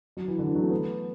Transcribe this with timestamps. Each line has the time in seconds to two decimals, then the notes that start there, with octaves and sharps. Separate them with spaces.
0.17 F#3
0.28 E3
0.39 D3
0.47 E3
0.55 F#3
0.63 A3
0.71 B3